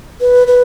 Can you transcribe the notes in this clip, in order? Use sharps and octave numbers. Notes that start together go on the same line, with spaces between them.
B4
B4